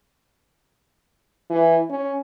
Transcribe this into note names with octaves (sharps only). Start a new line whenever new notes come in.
E3
C#4